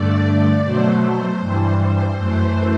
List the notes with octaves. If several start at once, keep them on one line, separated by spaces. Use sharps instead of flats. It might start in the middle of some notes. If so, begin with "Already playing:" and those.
Already playing: G2 D3 A3 D5
B2 F#3 A3 C5
C5
G2 E3 G3
C5
F#2 E3 A3 C5